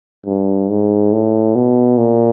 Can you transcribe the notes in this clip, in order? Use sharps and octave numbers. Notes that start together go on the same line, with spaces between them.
G2
G#2
A2
B2
A#2